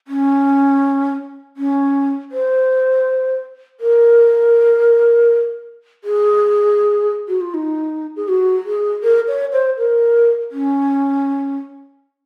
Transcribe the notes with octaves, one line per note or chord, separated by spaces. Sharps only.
C#4
C#4
C5
A#4
G#4
F#4
F4
D#4
G#4
F#4
G#4
A#4
C#5
C5
A#4
C#4